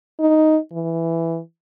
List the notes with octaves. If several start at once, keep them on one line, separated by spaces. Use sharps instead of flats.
D#4
E3